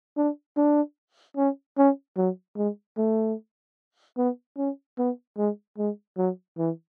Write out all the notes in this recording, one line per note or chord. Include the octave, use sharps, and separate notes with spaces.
D4
D4
C#4
C#4
F#3
G#3
A3
B3
C#4
B3
G#3
G#3
F#3
E3